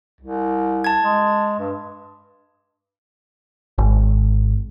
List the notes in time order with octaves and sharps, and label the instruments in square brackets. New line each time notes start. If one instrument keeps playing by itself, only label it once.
[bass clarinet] C2
[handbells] A5 G#6
[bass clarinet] G#3
G2
[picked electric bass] G#1